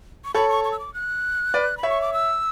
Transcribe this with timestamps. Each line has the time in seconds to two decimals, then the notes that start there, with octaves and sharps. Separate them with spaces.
0.25 C#6
0.34 A4 C#5 B5
0.49 C#6
0.64 C#6
0.72 E6
0.79 D6
0.94 F#6
1.54 B4 D5
1.77 B5
1.83 C#5 E5
1.89 C#6
2.01 D6
2.13 E6